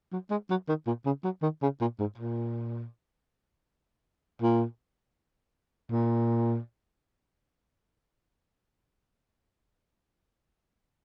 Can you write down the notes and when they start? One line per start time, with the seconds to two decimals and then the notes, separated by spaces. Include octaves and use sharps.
0.13 F#3
0.31 G#3
0.50 F#3
0.68 D#3
0.87 A#2
1.06 C#3
1.24 F#3
1.42 D#3
1.62 C#3
1.81 A#2
1.99 G#2
2.18 A#2
4.42 A#2
5.91 A#2